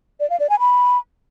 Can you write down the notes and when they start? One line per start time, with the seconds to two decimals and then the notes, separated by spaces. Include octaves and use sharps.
0.20 D5
0.30 F5
0.40 D5
0.50 G#5
0.59 B5